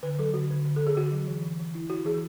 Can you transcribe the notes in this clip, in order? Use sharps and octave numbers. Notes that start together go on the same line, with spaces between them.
D3 B4
F#3 A4
D3 F#4
D3
D3
A4
D3
G#4
D3 F#4
F#3
E3
E3
E3
E4
E4 F#4
E3 G#4